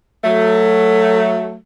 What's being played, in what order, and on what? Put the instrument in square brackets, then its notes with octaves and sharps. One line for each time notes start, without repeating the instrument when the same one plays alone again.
[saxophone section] F#3 A3